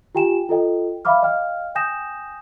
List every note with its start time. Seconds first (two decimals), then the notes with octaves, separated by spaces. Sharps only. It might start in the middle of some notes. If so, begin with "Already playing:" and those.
0.15 F4 G4 G5 G#5 E7
0.49 F4 A4 D#5 G5
1.05 E5 F5 B5 D6 F6
1.22 D#5 F5 G5 F6
1.75 G5 G#5 D#6 G6 A#6 E7